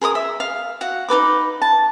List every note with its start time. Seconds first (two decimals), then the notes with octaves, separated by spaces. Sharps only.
0.01 G#4 A#4 B5 D#6
0.15 E5
0.40 F5
0.81 F#4 F#5
1.08 D#4 A4 B4 D6
1.62 A5